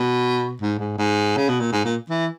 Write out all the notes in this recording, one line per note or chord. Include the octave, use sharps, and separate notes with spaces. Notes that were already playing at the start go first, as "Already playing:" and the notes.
Already playing: B2
G#2
G#2
G#2
C#3
B2
A#2
G#2
A#2
E3